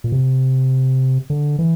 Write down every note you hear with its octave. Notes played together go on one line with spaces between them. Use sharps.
A#2
C3
D3
E3